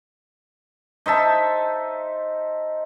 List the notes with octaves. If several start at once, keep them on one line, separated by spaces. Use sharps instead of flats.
D#4 C5 E5 A5